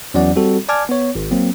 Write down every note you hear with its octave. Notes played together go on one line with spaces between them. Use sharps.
E2 E3 F#3 C#4 D5 F#5
G3 C4 F#4 A4
D5 G#5 A5 D6 F6 G#6
B3 C#5
G#1
F#3 A#3 C4